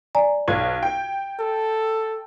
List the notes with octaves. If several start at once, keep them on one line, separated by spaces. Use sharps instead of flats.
D5 G#5 A#5
B1 G#6
G5
A4